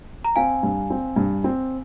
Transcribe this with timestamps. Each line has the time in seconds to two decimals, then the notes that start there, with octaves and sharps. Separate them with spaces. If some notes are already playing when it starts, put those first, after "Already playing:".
0.25 A#5
0.36 C4 F5 G#5
0.63 G2
0.90 C4
1.16 G2
1.44 C4